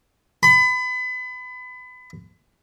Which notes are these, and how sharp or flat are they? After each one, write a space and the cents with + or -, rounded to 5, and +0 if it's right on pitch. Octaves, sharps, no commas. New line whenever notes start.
B5 +30